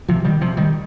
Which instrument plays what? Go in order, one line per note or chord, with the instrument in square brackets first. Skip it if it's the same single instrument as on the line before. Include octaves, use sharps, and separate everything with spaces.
[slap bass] C3 F3
D#3 G3
C3 F3
D#3 G3